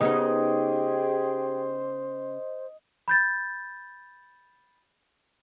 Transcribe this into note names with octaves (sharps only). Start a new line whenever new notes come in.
C#3 B3 D#4 G4 G#4 C5 D#5
B5 G6 A6